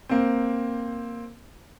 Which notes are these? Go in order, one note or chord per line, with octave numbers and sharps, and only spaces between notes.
A#3 C4